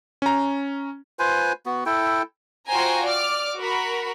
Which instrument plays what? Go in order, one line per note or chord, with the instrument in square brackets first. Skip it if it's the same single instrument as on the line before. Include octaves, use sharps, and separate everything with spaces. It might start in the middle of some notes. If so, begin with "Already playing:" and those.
[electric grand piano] C#4 A#5
[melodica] F4 B4 C5 G#5
B3 F#4
E4 A4 G5
[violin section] F4 F#4 C5 G5 G#5 A#5
D5 D6 F6
F#4 A#4 B5